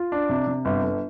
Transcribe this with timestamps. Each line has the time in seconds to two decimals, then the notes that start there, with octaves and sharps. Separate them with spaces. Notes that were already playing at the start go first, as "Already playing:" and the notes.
Already playing: F4
0.12 D4
0.29 C3
0.47 C3
0.65 G1
0.83 G1